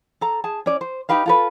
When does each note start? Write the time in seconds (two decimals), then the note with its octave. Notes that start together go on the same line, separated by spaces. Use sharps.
0.21 A4 A#5
0.44 G#4 A5
0.66 C#4 D5
0.81 C5
1.09 D#4 G4 B4 F5
1.26 F4 A4 B4